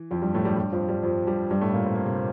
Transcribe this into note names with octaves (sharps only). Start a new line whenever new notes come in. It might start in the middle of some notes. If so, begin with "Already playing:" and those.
Already playing: E3
F2 F3
G2 G3
A2 A3
G2 G3
G2 G3
F2 F3
G2 G3
F2 F3
G2 G3
G2 G3
A2 A3
A#2 A#3
C4
A#3
C3 C4